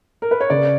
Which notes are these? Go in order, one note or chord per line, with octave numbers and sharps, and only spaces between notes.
A#4
B4
C#5
C#3 D5